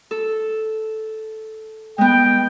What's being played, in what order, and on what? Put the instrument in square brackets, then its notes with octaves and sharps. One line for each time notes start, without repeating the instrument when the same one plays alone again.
[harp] A4
[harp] G#3 B3 [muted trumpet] G5